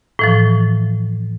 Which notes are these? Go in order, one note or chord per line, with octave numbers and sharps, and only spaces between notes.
A2 E3 F3